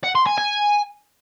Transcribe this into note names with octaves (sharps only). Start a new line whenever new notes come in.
F#5
C6
G#5
G#5